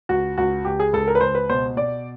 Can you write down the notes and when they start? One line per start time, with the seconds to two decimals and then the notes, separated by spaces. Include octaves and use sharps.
0.09 C#2 F#4
0.38 C#2 F#4
0.65 C#2 G4
0.80 G#4
0.93 C#2 A4
1.07 A#4
1.15 B4
1.21 C#2 C5
1.35 B4
1.50 B2 C5
1.77 B2 D5